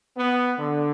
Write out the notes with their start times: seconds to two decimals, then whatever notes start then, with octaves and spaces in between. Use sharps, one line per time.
0.17 B3
0.58 D3